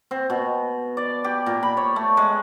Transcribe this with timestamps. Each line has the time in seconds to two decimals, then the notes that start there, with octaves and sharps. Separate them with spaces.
0.11 C4
0.30 B2
0.97 D5
1.24 G4
1.46 A#2
1.63 B5
1.77 C#5
1.96 A3
2.17 G#3